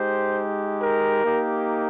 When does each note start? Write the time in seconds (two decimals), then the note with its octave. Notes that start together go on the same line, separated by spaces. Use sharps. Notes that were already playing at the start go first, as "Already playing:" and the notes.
Already playing: G#3 D#4 G4 C5
0.82 A#4
1.24 A#3 D#4 G4